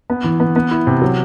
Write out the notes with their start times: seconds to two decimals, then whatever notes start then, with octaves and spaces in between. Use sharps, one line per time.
0.10 B3
0.24 E3
0.40 B3
0.56 B3
0.71 E4
0.87 C3
1.02 F#3